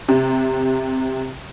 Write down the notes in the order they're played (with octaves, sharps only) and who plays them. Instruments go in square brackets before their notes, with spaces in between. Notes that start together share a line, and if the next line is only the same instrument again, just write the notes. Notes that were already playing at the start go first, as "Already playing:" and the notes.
[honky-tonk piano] C3